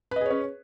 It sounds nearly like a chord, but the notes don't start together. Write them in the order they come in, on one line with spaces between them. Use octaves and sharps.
B4 D#5 G#4 C#5 C#4